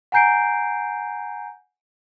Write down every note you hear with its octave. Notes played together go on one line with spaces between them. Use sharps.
F#5 G#5 A#5 G6 C7 D7